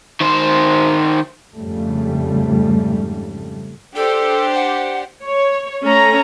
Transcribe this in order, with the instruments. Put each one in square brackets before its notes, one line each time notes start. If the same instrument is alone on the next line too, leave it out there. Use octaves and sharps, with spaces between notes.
[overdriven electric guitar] D#3 C5
[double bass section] F2 G#2 C#3 G3 A3
[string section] D4 G4 C5 [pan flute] A4
[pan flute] F#5
[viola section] C#5
A3 C#4 A#5